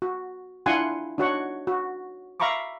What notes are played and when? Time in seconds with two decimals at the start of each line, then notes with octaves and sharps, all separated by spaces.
0.02 F#4
0.66 D4 E4 F4 F#5 G#5 C6
1.18 D4 D#4 F#4 C#5 F#5 C#6
1.67 F#4
2.40 E5 F5 A#5 B5 C#6 D6